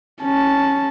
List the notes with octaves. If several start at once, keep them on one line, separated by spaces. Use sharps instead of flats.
C#4 A5